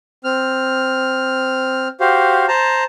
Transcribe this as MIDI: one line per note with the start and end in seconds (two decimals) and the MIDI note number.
0.24 1.88 60
0.24 1.88 89
2.00 2.46 66
2.00 2.46 67
2.00 2.46 72
2.00 2.46 77
2.48 2.84 72
2.48 2.84 81
2.48 2.84 82